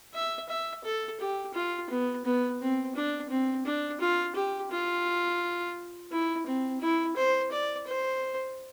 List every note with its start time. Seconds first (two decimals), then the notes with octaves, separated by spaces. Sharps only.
0.14 E5
0.49 E5
0.84 A4
1.20 G4
1.54 F4
1.90 B3
2.25 B3
2.60 C4
2.95 D4
3.30 C4
3.66 D4
4.01 F4
4.35 G4
4.71 F4
6.12 E4
6.46 C4
6.81 E4
7.16 C5
7.52 D5
7.87 C5